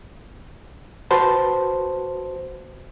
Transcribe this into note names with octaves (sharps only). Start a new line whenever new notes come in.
F#4 B4 C5 A5